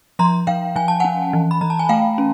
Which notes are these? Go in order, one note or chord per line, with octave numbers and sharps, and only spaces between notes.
F3 A#5 C6
F3 F5 G5
F3 G#5
A5
C#4 F#5 G#5
E3
B5
E3 A#5
A5
G#5
A3 F5 G5
C#4